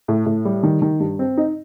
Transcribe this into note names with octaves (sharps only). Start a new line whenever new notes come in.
A2
A2
G3
D#3
D#3
G2
C4
D#4